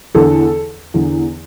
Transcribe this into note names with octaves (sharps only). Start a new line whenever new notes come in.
E2 D3 A4
E2 D3